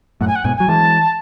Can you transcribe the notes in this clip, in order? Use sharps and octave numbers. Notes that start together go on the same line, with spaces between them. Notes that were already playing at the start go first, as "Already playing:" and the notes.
F#2 A2 F#5
G#5
F#5
G#2 B2 G#5
F#3 G#5
E3 G#3 A5